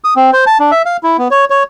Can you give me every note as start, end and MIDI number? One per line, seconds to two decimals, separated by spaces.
0.04 0.14 87
0.16 0.31 60
0.33 0.45 72
0.47 0.58 81
0.60 0.71 62
0.71 0.82 76
0.86 0.97 77
1.03 1.17 64
1.18 1.28 59
1.31 1.45 73
1.50 1.63 73